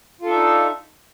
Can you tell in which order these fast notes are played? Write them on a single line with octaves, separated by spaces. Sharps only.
F4 A4 D4 E5 D#4